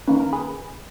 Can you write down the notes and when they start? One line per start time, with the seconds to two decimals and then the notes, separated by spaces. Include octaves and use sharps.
0.07 D#3 A#3 C#4 B4
0.20 A#4
0.33 G#4 B4